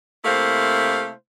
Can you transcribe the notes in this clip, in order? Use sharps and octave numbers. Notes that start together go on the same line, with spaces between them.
C3 A3 A#3 E4 C5 F5